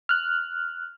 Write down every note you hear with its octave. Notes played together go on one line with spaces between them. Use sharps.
F6 F#6